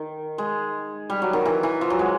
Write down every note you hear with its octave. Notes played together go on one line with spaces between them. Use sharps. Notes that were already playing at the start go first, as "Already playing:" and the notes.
Already playing: D#3
G#3
G3
F#3
D#3
E3
E3
F3
F#3
G#3